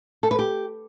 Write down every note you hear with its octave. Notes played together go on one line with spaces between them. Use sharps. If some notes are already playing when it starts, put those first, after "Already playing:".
A4
B4
G4